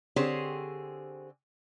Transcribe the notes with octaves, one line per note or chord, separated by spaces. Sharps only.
D3 C4 G4 G#4 C5 C#5